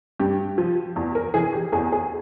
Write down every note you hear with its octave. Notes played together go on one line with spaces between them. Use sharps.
G2 G4
F3
E2
A#4
E3 G#4
G4
E2 G#4
G#4